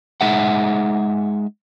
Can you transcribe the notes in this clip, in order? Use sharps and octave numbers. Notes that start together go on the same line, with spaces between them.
G#3 D#4 G#4 E5 F#5